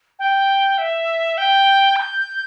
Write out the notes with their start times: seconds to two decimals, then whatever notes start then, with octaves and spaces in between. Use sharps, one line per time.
0.19 G5
0.78 E5
1.38 G5
1.96 G6